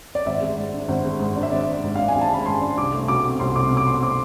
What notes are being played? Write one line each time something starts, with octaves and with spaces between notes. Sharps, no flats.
D5
G#1 E5
G#3
G#2
D4
G#1
G#3
G#2
D4
E5
G#1 D5
G#3
G#2
D4 F5
G#5
G#1
A5
G#3 B5
G#2 C6
D4
C2 D6
A3
B2 D6
C4
C2 C6
A3 D6
B2
D6
C4 C6
D6